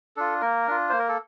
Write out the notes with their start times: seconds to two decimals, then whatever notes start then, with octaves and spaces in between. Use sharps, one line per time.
0.16 D4 F4 A4
0.41 A#3 A#4
0.67 D4 F4
0.89 A#3 C5
0.99 A#4
1.09 A4